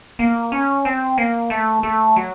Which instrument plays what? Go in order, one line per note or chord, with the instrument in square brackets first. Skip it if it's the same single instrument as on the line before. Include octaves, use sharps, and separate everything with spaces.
[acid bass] A#3
C#4
C4
A#3
A3
A3
F#3